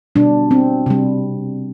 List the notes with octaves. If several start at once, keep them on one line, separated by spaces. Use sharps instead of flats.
B2 G3 D4
C4
C3 G3